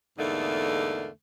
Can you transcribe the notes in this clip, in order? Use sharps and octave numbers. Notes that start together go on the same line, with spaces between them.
E2 G#2 D3 A3 A#3 D#4